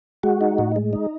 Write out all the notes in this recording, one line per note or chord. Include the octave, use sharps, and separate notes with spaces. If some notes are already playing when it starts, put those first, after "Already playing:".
G#3 F#4
D#4
A2
G#3
D#4